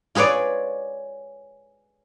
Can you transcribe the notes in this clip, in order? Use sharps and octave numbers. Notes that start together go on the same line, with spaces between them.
F4 G#4 B4 C#5 D5